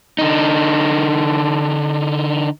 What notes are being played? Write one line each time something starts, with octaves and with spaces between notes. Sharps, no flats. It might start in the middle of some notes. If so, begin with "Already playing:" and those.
D3 D#4